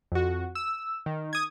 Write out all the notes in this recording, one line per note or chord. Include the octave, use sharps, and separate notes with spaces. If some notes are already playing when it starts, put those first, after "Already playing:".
F2 F#4
E6
D#3
D#6 G#6